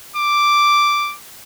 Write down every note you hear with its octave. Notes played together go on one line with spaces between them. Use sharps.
D6